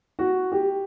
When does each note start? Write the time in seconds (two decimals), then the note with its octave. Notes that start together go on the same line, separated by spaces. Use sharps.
0.19 F#4
0.52 G4